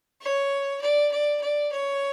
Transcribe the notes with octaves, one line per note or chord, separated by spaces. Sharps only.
C#5
D5
D5
D5
C#5